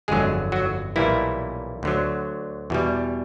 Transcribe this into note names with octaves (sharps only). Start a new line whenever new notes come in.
G1 F2 D3 F#3 G#3 G#4
F#3 F#4
B1 A#2 E3 G3 A#3 E4
D2 D3 F#3
E2 B2 G3